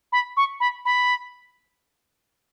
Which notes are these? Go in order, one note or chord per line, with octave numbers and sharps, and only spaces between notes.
B5
C#6
B5
B5